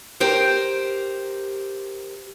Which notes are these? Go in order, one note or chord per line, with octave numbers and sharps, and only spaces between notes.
G4 A#4 C5